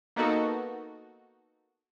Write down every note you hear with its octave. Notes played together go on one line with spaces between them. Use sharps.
A#3 B3 D#4 F#4 A4